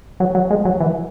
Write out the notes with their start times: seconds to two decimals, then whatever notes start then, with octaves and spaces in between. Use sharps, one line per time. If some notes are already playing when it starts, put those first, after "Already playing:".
0.20 F#3
0.35 F#3
0.50 G#3
0.65 F#3
0.80 E3